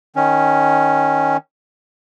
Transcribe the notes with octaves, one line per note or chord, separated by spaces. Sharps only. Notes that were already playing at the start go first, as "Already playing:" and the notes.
D#3 C#4